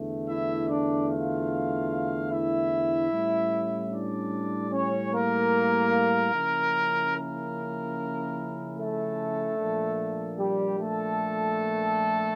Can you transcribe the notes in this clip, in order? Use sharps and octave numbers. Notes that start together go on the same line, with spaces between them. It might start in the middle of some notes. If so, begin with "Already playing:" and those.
Already playing: E2 D3 A3
E4 E5
D4 D5
F4 F5
E4 E5
A2 G3 C#4
D4 D5
C#4 C#5
A#3 A#4
C#3 F3 A#3 C#4 E4
A#3 A#4
A3 A4
A#2 F3 A#3 D4
G3 G4
A3 A4